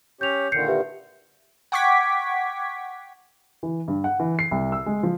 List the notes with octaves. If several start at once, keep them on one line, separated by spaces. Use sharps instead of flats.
C#4 G4 C#5 G6 F7
A#2 D3 D#3 G6 C7 C#7
G4 B4 E5
F#5 G5 C#6 D6 G#6 B6
E3
G2
F#5
E3
C7
C2
E6
G#3
F3